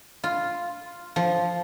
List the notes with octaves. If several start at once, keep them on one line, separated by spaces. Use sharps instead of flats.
F4
F3